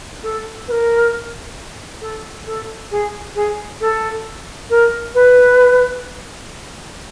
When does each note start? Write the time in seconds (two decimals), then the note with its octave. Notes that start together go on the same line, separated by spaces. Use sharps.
0.23 A4
0.67 B4
0.71 A#4
2.01 A4
2.46 A4
2.91 G#4
3.35 G#4
3.80 A4
4.69 A#4
5.14 B4